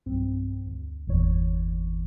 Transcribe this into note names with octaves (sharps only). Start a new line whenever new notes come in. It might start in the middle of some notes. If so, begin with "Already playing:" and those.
B1 G2 C4
D2
G1 E2 A#2 E3 C#5